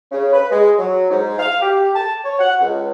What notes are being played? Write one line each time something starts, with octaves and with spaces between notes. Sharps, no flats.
C#3
B4
G#3
F#3
G#2
F5
G4
A5
C#5
F#5
C#2